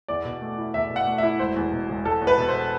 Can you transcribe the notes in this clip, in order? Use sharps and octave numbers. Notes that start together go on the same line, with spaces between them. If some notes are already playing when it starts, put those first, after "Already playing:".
E2 D5
B2
A3
E4
E2 E5
B2
F#5
A3
E4 E5
E1 C5
E2
B2
E1
E1 A4
E2
B4
B2
C5